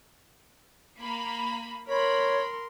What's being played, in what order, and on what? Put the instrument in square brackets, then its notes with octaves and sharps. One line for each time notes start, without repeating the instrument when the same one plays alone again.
[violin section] A#3 B5
[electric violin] A#4 C6 [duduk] C#5 [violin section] B5